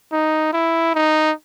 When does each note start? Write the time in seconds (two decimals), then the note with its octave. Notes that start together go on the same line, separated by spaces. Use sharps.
0.12 D#4
0.53 E4
0.95 D#4